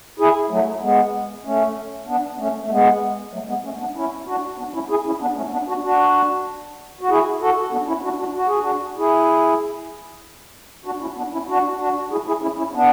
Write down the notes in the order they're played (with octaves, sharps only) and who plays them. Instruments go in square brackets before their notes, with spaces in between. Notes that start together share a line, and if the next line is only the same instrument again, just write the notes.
[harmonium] E4 G#4
F#3 A3
G#3 B3
A3 C#4
B3 D4
A3 C#4
A3
G#3 B3
F#3 A3
G#3 B3
A3 C#4
B3 D4
C#4 E4
D4 F#4
B3 D4
C#4 E4
E4 G#4
C#4 E4
B3 D4
A3 C#4
B3 D4
D4 F#4
D4 F#4
F#4
E4 G#4
F#4 A4
B3 D4
C#4 E4
D4 F#4
D4 F#4
F#4
G#4
D4 F#4
E4 G#4
D4 F#4
C#4 E4
B3 D4
C#4 E4
D4 F#4
D4 F#4
E4 G#4
E4 G#4
C#4 E4
C#4 E4
B3 D4